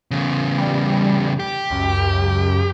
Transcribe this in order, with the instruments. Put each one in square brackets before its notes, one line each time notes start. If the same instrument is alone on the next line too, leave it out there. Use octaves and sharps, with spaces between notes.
[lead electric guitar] E2 C#3
[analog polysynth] G3
[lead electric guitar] G4
[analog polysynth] C#2 F#2